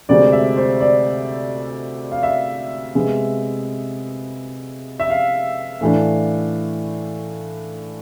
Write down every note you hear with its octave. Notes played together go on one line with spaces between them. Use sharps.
D2 C3 G#3 C4 D5
E5
C5
D5
F5
E5
C3 G#3 B3
E5
F5
A2 E3 A3 D4